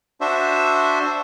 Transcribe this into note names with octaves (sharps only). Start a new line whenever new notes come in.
D4 F#4 C5 E5